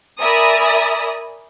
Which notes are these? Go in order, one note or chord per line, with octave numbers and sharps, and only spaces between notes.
A#4 D5 E5 G#5 B5 D#6